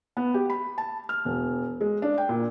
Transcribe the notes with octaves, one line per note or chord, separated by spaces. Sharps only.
B3
G4
B5
A5
F6
E1
G#3
D4
G5
A#2